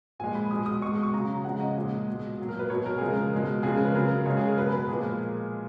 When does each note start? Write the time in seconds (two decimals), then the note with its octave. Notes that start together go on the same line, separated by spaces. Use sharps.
0.20 A#2 F3 G#3 G#5
0.35 B5
0.51 B2 G#3 D#6
0.66 D#6
0.82 B2 G#3 C#6
0.93 D#6
1.03 C#6
1.13 C#3 F#3 A#5
1.44 C#3 F3 G#3 F#5
1.60 D#5
1.76 A#2 G#3
2.08 B2 G#3
2.38 A#2 F#3
2.49 A#4
2.59 B4
2.70 B2 F#3 C#5
2.86 A#4
2.98 C#3 F3 G#3 G#4
3.10 A#4
3.33 B2 G#3
3.63 C#3 F3 G#3 G#4
3.74 A#4
3.85 B4
3.95 C#3 F#3 A#4
4.26 C#3 G#3 C#5
4.37 G#4
4.47 A#4
4.57 B2 F#3 B4
4.72 B4
4.89 A#2 F3 G#3 G#4
5.04 A#4